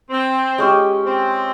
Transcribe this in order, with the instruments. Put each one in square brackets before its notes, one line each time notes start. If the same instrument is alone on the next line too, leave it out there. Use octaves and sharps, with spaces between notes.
[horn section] C4
[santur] G#3 C#4 G4
[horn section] C4